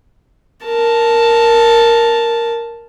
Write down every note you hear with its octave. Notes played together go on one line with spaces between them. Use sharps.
A#4 A5